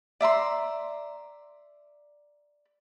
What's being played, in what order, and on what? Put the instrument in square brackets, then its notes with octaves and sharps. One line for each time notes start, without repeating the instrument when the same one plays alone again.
[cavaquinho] D5 E5 A#5 C6